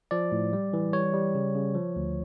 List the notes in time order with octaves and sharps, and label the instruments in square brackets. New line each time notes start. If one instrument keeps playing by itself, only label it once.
[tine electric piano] F3 D5
A2
G3
E3
G3 C#5
G3
C#3
C#3
F3
D2